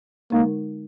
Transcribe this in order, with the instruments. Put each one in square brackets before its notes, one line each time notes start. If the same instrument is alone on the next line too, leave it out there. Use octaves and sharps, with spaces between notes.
[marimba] D3 G#3 D#4 A#4 [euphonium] A#3